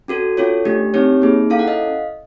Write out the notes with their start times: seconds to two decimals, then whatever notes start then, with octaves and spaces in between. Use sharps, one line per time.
0.08 C#4 F#4 A4
0.37 C#4 F4 A4 C#5
0.65 A3 D4 G4
0.94 C4 D#4 G4 C#5
1.22 A#3 D#4 G#4
1.50 C#4 E4 A4 F5
1.59 F#5
1.68 D#5 F5